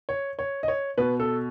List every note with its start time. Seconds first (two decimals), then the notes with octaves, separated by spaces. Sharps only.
0.09 C#5
0.39 C#5
0.63 D#5
0.68 C#5
0.98 B2 B4
1.20 A4